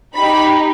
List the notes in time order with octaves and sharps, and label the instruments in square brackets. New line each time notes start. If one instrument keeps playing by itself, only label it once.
[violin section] D#4 G4 B5